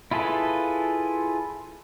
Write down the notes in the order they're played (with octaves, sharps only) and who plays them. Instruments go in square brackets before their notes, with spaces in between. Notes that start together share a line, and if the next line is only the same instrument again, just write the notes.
[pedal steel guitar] E4 F4 G#4 A4 B4